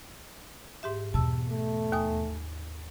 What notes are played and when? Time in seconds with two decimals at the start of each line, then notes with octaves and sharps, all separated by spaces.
0.83 G#2 G4 E5
1.14 E2 B2 A5 E6
1.49 A3
1.92 D#2 G#5 D#6